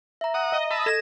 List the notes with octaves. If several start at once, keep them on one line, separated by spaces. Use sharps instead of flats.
E5 A#5
F#5 D#6
D#5
E5 A5 B5
A4 G#6 A#6 E7